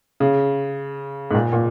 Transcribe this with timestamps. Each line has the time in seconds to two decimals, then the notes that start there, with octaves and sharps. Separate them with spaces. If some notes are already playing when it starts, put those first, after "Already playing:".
0.20 C#3
1.31 G#2
1.35 A#2
1.53 A#2